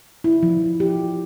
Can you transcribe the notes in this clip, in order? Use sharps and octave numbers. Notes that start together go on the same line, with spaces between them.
E4
F3
G4